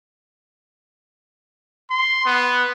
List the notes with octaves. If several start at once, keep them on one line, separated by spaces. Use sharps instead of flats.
C6
B3